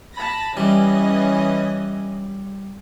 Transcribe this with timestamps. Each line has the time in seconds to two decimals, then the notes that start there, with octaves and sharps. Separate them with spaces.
0.15 A5 B5 A#6
0.57 E3 G3 C#4 D#5